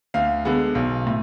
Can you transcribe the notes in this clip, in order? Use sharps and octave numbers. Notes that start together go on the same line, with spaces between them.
D2 F5
D3 G#3 B3
B1
A2